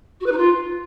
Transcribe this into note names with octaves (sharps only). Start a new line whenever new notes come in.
F#4
B4
D#4
F4